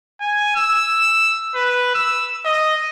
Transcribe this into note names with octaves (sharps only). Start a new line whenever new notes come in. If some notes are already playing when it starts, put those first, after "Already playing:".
G#5
E6
B4
E6
D#5